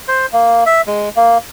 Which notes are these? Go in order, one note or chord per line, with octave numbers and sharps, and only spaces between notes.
C5
A#3
E5
G#3
A#3